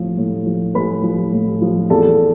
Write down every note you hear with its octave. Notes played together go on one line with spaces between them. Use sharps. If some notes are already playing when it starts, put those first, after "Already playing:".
Already playing: A2 F3
A2
F3
A2 B4 B5
F3
A2
F3
E2 A4 A5